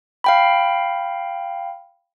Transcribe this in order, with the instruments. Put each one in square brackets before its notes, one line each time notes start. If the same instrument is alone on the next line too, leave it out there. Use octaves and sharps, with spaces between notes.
[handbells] F5 G5 B5